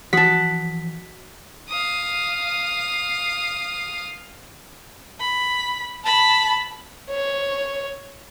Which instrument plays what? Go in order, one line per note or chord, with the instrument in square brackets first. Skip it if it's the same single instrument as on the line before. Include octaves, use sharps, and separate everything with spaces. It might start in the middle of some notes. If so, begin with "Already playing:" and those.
[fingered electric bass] E3 F3 [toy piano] F#4 D#6 [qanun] F#5 A5 [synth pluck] B6
[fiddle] F5 D#6
[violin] B5
A5 B5
[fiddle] C#5